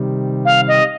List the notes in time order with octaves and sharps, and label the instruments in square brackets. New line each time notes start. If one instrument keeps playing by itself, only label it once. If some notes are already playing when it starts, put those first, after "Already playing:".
Already playing: [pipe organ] C3 D#3 G3
[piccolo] F5
D#5